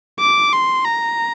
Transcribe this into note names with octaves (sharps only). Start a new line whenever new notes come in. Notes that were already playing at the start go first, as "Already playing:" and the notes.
D6
C6
A#5